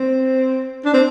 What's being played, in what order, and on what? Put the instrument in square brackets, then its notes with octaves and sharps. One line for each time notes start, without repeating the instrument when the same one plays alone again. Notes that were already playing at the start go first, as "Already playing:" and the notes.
Already playing: [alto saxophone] C4
D4
C4